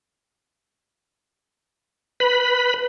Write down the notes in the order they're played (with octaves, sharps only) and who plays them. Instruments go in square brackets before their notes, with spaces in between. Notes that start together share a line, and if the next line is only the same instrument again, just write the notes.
[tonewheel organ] B4 B5